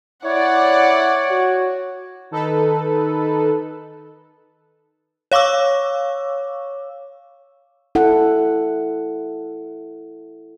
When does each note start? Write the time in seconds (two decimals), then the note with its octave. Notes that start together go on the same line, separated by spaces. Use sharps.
0.25 E4 C#5 D5 F#5
1.30 F#4
2.31 D#3 D#4 A4 B4
5.32 C#5 F5 C#6 D6 E6
7.95 E4 A4 F#5